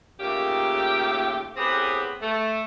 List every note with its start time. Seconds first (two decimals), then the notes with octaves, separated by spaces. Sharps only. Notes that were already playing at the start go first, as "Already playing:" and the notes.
0.20 D#2 A#2 C#3 A3 G4
1.57 A2 B3 C4 G4 G#4 B4
2.22 A3